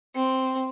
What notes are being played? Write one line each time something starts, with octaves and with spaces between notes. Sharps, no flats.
C4